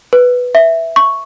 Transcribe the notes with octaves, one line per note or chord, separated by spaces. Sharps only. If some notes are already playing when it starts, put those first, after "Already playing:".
B4
E5
C#6